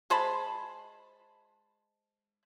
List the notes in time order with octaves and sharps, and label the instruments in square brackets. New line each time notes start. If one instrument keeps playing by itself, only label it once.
[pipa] G#3 C5 A5 B5